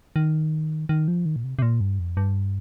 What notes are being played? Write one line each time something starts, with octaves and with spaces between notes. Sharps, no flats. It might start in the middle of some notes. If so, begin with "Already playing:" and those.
D#3
D#3
F3
D#3
A#2
C3
C3
A#2
G2
F2
G2